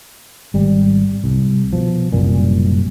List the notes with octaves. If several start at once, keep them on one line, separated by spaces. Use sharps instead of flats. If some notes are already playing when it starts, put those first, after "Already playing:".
G#1 G3
C2
B2 F3
F#1 C2 F#2 A#2